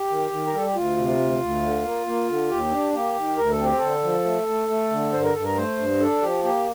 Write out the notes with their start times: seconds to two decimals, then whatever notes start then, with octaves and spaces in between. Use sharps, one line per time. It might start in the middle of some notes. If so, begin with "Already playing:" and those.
Already playing: G4
0.10 D#3
0.31 D#3
0.46 A#4
0.53 G3 A4
0.66 G4
0.75 D2 F4
0.97 C3
1.19 D2
1.41 D2
1.62 D3
1.84 A#3
2.06 A#3
2.28 D3
2.50 D#2 G4
2.72 D4
2.94 A#3 G4
3.16 D#3
3.37 D2 A#4
3.51 A4
3.59 C4
3.65 G4
3.78 D3 A4
4.03 F3
4.25 A3
4.47 A3
4.69 A3
4.91 D3
5.13 G2 C5
5.23 A#4
5.33 G2 A4
5.44 A#4
5.56 A3 C5
5.78 G2
6.00 D4 A4
6.22 F3 G4
6.44 A#3 G4